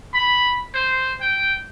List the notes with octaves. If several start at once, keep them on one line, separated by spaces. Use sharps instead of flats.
B5
C5
G5